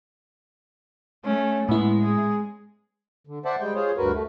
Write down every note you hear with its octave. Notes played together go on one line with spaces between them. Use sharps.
A3 C#4
A2 G#3 B3 E4
G#4
D3
C5 D5 E5 F#5 A5
G3 G#3 G5
F4 G#4 C5 C#5
D2 G2 F#4 A#4 B4
A3